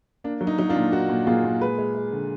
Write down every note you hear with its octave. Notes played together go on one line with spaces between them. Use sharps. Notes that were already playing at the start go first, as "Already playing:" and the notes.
A#3 D4
F#3
D#4
F#3 D#4
D4 F4
A#2
A#3 D#4 F#4
A#2
A#2 F4 G#4
A#2
G#3 G#4 B4
G#3
G#3
D3